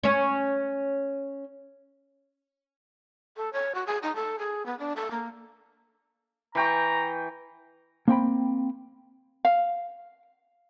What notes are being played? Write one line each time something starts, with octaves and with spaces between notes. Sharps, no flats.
C#4 C#5
A4
C#5
F#4
G#4
D#4
A4
G#4
B3
D4
A4
A#3
E3 G5 A#5 C#6
A#3 C4 G5 B5
F5